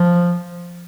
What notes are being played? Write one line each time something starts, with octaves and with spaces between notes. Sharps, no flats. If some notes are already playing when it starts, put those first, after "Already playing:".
Already playing: F3